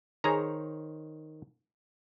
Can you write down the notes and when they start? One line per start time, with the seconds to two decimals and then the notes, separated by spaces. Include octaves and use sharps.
0.24 D#3 G#4 C5 C#5 A#5